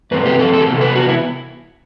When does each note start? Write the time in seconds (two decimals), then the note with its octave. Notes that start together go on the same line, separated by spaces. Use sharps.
0.11 G2 E3 A3 C4 B4
0.26 G4
0.39 A4
0.54 A4
0.61 G4
0.66 C3 E3 B3 A4
0.81 B4
0.95 F#4
1.09 E4